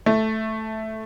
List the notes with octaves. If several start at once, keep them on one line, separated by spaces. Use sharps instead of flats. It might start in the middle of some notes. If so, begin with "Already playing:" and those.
A3